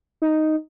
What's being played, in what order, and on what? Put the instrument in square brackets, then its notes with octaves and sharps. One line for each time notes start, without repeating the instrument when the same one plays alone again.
[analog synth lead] D#4